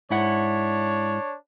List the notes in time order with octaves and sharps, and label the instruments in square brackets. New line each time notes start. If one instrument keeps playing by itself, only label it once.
[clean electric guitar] G#2 E4 F#5 [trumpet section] D4 C#5